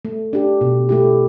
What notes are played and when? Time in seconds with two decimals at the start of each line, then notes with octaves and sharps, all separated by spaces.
0.05 A3
0.33 D4 G4
0.61 B2
0.89 A3 E4 G4